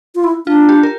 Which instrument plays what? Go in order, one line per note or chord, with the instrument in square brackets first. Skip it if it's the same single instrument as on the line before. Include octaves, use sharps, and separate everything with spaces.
[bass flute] F4
E4
[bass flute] D4 [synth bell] F4
[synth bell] G4
A#4